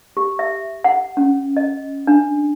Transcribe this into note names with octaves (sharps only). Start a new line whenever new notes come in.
G4
E5
F#5
C#4
D#5
D4